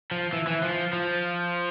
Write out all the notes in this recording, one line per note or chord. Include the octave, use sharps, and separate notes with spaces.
F3
E3
E3
F3
F3